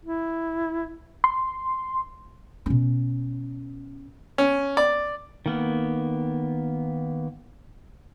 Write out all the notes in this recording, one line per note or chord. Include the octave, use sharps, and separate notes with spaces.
E4
C6
B2 C#4
C#4
D5
D#3 A#3 B3